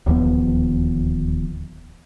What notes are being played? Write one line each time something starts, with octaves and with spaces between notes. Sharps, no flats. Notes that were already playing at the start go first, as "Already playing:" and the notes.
D1 D#2 F3 B3